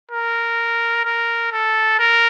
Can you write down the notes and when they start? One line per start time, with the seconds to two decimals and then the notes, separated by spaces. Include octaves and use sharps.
0.11 A#4
1.05 A#4
1.52 A4
1.99 A#4